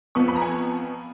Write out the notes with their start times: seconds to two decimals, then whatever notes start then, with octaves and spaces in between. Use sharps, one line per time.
0.15 F2 F3 B3 C#6
0.28 B5
0.36 A#5
0.42 G#5